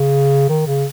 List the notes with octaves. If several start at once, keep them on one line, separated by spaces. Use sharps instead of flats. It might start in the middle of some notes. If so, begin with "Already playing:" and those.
Already playing: C#3
D#3
C#3